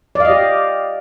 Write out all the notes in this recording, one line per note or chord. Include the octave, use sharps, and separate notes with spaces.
G4 D5 D#5 F5